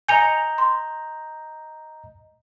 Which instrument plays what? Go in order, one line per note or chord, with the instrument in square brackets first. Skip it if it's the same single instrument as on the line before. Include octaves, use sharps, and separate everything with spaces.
[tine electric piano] D#5 A#5 G6 [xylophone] G#5 C#7 F7
[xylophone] C6